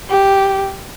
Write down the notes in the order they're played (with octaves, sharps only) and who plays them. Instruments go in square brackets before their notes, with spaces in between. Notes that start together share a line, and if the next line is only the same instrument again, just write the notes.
[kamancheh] G4